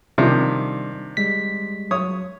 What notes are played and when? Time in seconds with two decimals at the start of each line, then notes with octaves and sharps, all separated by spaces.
0.18 C3 D#3 F3 G3 D4 D5
1.17 G3 G#3 B6
1.91 F#3 C#5 D#6